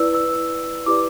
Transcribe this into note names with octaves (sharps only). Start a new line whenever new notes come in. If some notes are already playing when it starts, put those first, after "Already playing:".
Already playing: E4 B4 D5 E6
E6
E4 G4 B4 D5 D6